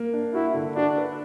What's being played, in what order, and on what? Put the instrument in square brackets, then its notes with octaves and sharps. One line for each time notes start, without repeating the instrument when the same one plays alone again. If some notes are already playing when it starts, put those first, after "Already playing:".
Already playing: [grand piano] A#3
D4
[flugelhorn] E4 [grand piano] F#4
[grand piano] D3
[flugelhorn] D4 [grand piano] F#4
[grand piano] B4